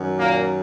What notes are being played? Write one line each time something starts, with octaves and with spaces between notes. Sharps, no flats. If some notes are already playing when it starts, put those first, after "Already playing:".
Already playing: F#2 D#3 F#3
A#2 A#3